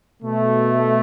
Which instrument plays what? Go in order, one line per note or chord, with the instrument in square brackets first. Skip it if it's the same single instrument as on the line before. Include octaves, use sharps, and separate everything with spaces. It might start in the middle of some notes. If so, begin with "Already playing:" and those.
[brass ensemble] B2 A3